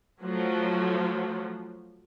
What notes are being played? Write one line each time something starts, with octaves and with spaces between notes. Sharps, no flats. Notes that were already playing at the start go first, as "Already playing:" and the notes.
F3 F#3 A3